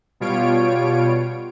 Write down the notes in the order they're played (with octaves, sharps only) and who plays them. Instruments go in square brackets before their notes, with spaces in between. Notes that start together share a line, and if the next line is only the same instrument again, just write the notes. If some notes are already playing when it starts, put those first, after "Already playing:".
[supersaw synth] B2 G3 F4 C#5 D7